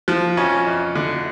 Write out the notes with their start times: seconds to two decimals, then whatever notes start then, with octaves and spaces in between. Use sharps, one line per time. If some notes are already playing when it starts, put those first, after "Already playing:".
0.08 F3
0.37 F2 C#4
0.67 F2
0.96 D3